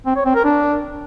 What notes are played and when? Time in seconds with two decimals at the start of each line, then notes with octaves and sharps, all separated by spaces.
0.06 C4
0.16 C#5
0.25 C4
0.35 A#4
0.44 D4